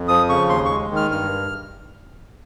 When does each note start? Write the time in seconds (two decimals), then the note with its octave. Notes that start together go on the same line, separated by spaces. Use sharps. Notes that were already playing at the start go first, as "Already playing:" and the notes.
Already playing: F2
0.08 F3 D#6
0.29 C#3 C#6
0.49 D#2 C6
0.65 G#3 C#6
0.91 D#3
0.96 F6
1.11 G2 F6